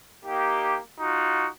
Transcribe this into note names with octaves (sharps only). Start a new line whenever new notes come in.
A#3 D#4 G4
D#4 F4 F#4